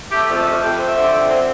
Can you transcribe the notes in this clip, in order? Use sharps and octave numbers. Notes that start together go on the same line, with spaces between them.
A3 G4
F2
A4
A3
F2 G4
C4
E5
D3
F2
C4